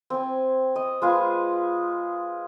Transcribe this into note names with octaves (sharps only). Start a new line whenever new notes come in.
C4 G#5
D#5
G#3 F4 G#4 B4